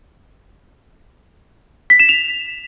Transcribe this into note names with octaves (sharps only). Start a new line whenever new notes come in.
B6
E7
F7